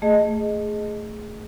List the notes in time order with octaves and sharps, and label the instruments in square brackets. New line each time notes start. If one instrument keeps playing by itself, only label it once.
[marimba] A3 G#4 D#5